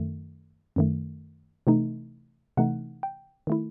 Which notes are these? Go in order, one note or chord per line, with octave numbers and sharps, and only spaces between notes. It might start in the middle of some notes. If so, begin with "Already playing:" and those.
Already playing: F#2 D#3 A3
F#2 D#3 A3
C3 E3 A3 D#4
C3 E3 A3 D#4 F#5
G5
D#3 A3 E4